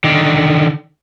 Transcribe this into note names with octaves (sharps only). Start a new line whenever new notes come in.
D3 D#3